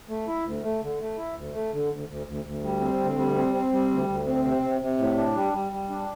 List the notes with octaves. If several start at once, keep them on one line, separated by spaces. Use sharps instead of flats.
A3
E4
D2
A3
D3
A3
E4
D2
A3
D3
D2
D2
D2
D2
G3
C4
D2
G3
C4
C4
G3
D2
D2
C4
C3
C3
C3
A2
D4
G3
G3
G3
D4